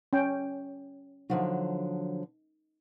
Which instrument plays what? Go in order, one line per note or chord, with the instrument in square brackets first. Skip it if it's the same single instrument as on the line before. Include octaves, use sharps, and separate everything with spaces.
[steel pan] C#4 G5
[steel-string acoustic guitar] D3 F3 F#3 [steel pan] D#4